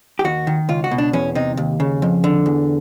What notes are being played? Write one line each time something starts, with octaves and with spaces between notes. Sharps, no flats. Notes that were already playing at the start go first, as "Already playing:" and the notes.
G4
D#2 F#4
D#3
C#2 F4
F#4
B2
D4
E2 C#4
C3 D#4
D#2
C#3
F2
D3
E2